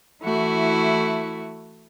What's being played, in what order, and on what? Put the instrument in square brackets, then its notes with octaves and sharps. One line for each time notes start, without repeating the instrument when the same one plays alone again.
[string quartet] E3 A3 E4 F#4